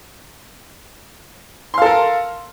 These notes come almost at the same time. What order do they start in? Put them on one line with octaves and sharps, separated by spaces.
C6 F5 A4 A#4